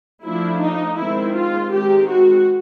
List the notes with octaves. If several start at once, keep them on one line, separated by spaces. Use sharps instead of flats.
F3 A3 D4 E4
D#4
D#3 G#3 C4 E4
F4
D#3 G#3 C4 G4
F#4